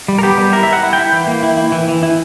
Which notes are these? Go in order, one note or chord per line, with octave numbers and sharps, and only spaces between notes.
G3
A#4
B3 G4
G3
E4 A#4
E5
E4
F#5
E4
G5
E4
E3
A#3
E4
E4
E3
E3
E4